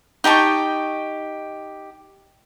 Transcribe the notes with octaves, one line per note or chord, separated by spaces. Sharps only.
D#4 G4 A5 C#6